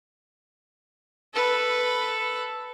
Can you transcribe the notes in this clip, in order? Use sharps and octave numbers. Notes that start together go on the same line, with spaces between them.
A4 B4